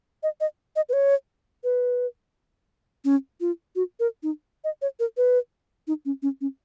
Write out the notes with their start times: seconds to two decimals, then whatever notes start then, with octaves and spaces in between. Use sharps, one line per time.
0.23 D#5
0.40 D#5
0.76 D#5
0.89 B4
0.93 C#5
1.64 B4
3.05 C#4
3.41 F4
3.76 F#4
4.00 A#4
4.23 D#4
4.64 D#5
4.82 C#5
5.00 A#4
5.17 B4
5.87 D#4
6.05 C#4
6.22 C#4
6.41 C#4